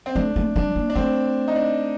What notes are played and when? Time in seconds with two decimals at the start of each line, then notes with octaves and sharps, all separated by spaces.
0.06 C4
0.15 A3 D4
0.36 A3
0.56 G3 D4
0.76 A#3
0.90 D4
0.95 A3 C4
1.48 D#4
1.56 D4